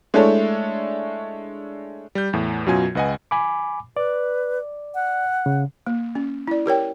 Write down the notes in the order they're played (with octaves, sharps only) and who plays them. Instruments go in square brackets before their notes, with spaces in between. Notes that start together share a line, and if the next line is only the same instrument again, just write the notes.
[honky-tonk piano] G#3 A3 D4 E4 A4 C#5
[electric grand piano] G3 G6
E2 A2
F#2 B2 F#3 F4 G#5 G#6
C#2 B4 D#5 F#5 G#5
[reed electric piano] G#5 B5 D6
[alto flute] B4 [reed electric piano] D5
[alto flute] F#5
[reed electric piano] C#3
[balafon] A#3
C#4
E4 D5
G4 A#4 C#5 G5